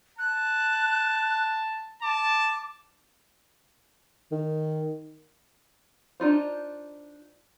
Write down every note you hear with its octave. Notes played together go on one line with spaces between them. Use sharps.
A5 F#6
A5 D6
D#3
D4 D#4 F4 C5